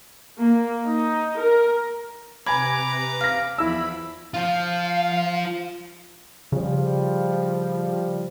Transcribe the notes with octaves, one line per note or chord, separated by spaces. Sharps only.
A#3
D#4
A#4
C3 B4 G#5 A#5 B5 D6 G#6
F5 F6 A#6
E2 F3 E4 B5 E6
F3 F4 F5
C#3 F3 G3